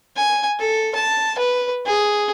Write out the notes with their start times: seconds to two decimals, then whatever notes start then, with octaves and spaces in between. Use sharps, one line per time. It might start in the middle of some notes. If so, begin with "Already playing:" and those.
0.16 G#5
0.60 A4
0.95 A5
1.38 B4
1.86 G#4